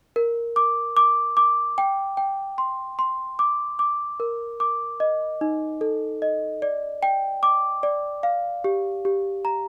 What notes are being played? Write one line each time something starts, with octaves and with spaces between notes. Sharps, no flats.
A#4
D6
D6
D6
G5
G5
C6
C6
D6
D6
A#4
D6
D#5
D#4
A4
D#5
D5
G5
D6
D5
F5
G4
G4
A#5